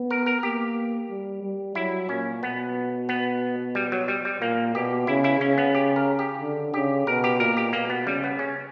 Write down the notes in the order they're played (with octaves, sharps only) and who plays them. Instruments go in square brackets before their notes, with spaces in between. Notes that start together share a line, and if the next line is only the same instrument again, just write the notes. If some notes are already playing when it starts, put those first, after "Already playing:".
Already playing: [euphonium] B3
[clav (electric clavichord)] A#4
A#4
[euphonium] A#3 [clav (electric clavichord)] G4
[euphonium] G3
G3
[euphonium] F#3 [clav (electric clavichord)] E4
[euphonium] A#2 [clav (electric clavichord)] C#4
[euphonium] B2 [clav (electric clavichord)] B3
[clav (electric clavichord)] B3
G3
F#3
G3
G3
[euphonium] A#2 [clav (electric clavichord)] A#3
[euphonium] B2 [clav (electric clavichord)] G4
[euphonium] C#3 [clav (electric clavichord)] E4
[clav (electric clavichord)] E4
[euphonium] C#3 [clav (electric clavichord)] C#4
[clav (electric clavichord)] B3
G4
A#4
G4
[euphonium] D3
[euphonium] C#3 [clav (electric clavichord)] G4
[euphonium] B2 [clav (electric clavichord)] A#4
[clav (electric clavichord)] G4
[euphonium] A#2 [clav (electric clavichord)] A#4
[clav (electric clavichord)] G4
[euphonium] B2 [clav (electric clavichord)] A#3
[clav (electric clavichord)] B3
[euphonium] C#3 [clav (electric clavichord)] G3
[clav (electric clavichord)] B3
C#4